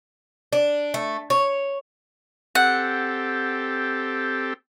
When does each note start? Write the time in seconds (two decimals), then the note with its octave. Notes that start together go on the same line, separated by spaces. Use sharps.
0.53 D4
0.94 A3
1.30 C#5
2.55 C4 G4 A4 F#5